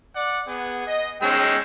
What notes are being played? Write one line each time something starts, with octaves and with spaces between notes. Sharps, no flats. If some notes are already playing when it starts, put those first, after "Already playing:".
D5 F#5
B3 G#4
D#5
G#3 C#4 D#4 G5 E6